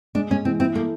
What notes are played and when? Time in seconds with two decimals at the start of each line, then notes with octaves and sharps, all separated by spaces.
0.15 G#3 D4
0.30 G#3 C#4
0.45 E3 C4
0.60 C4 E4
0.75 A#3 A4